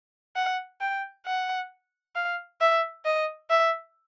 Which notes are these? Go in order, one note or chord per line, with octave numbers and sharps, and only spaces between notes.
F#5
G5
F#5
F5
E5
D#5
E5